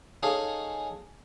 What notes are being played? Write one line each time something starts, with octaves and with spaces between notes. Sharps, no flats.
C#4 D#4 G#4 A4 D#5 F5